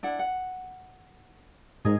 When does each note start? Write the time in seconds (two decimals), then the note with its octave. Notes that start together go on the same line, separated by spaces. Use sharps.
0.03 D4 E4 F#5
0.19 F#5
1.85 G#2 G#4 A#4 D#5